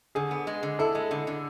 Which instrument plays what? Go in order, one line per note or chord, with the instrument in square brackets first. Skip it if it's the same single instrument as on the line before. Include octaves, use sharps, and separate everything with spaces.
[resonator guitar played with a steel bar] D3 [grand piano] G#4
[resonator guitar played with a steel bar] B3
G#3
D3
[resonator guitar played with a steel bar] E4 [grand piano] A4
[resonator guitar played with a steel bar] G#3
D3
D3